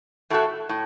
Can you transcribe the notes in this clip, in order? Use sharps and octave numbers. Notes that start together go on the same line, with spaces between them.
A2 A3 F#4 A4
A2